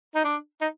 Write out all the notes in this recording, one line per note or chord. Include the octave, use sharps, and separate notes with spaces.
D#4
D4
D#4